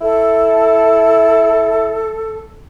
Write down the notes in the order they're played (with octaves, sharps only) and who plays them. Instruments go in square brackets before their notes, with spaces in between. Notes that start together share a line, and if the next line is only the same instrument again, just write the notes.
[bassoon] E4 [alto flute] A4